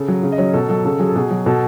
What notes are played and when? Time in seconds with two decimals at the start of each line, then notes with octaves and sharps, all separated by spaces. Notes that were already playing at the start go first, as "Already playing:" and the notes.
Already playing: C#3 A4
0.08 F#3
0.23 C#3
0.32 D#5
0.38 F#3 C#4 C#5
0.53 B2 A4
0.69 F#3 A4
0.85 C#3 A4
0.99 F#3 G#4
1.08 A4
1.16 B2 G#4
1.31 F#3
1.46 B2 A4